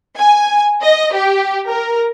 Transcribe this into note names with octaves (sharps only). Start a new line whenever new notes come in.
G#5
D#5
G4
A#4